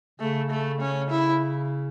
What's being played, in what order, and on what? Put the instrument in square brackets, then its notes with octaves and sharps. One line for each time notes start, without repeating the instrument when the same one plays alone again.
[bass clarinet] C#3 [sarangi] A3
[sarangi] A3
C#4
E4